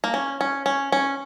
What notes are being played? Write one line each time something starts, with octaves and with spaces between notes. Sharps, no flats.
A#3
C#4
C#4
C#4
C#4